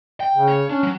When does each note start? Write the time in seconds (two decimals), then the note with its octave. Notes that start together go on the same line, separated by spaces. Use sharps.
0.20 G5
0.35 C#3
0.48 C#5
0.70 C#4 D4
0.83 F#3